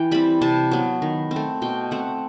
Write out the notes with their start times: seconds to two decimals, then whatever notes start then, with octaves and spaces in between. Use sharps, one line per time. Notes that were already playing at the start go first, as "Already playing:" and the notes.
Already playing: E3 G5
0.11 G3 C4 B5
0.42 C3 A5
0.71 F#3 B3
1.02 D#3
1.31 C4
1.36 A3
1.62 B2 G5
1.91 A3 C4 F#5